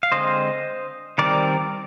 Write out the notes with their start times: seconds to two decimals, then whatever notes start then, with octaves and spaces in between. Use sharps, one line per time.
0.03 F5
0.12 D3 G#3 C4 C5 D#5
1.18 D#3 G3 C4 A#4 D5